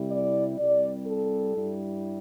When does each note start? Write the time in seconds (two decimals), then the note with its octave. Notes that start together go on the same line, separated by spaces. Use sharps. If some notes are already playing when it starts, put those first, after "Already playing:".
Already playing: C2 C3 G3 E4
0.10 D5
0.58 C2 C3 G3 D5
1.06 A4
1.54 G2 G3 E4